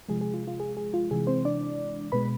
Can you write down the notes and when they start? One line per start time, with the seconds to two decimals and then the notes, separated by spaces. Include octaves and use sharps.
0.09 C3 F3 G#3 G#4
0.21 G#4
0.34 F4
0.47 F4
0.60 G#4
0.77 G#4
0.94 F4
1.11 C3 E3 G#3 G#4
1.27 C4 C5
1.45 D4 D5
2.12 B2 G#3 B4 B5